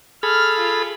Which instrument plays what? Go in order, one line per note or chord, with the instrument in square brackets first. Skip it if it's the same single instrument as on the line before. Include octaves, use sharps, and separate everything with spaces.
[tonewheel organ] G#4 A4 B5 [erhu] F6
[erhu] F4